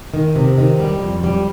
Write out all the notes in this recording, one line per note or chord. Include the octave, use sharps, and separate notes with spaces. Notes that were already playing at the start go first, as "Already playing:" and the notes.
D#3
C3
D#3
G3
F2
G3